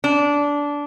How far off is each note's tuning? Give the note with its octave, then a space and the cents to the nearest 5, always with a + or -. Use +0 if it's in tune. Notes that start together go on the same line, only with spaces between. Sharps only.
D4 -15